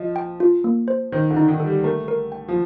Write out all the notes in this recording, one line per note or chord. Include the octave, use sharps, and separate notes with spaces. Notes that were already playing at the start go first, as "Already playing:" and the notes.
Already playing: F3 D#5
G5
F4
A#3
C5
D#3 C5
D3
D#4
D#3
A4
G3
A3 A#4
A#4
G5
F3